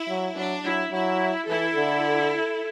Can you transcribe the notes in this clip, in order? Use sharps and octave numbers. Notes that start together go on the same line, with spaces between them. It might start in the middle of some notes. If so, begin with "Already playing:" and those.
Already playing: E4
F#3
F#3 D4
F#3 E4
F#3 E4
E3 E4 A4
D3